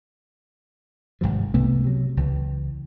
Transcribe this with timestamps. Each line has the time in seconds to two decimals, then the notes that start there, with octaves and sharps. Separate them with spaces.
1.21 G#1 G#2 C3 F3
1.54 C2 C3 A3 B3
1.84 C3 F#3
2.17 C#2 E3